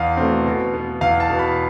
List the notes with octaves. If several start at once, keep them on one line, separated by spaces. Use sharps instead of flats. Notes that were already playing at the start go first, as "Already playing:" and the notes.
Already playing: E2 F5
B2 A3 C4
B2
B3
E2 F5
A5
B2 B3
B5